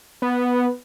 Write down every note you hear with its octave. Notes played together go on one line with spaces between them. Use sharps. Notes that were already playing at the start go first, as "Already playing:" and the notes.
B3